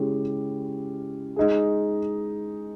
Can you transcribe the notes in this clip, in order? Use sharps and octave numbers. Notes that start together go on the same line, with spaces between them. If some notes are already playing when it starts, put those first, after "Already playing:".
Already playing: C#3 G#3 C#4 E4 G4
G#3 D#4 G#4